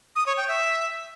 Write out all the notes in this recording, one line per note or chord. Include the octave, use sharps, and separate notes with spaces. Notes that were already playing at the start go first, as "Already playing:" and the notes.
D#6
C#5
G5
E5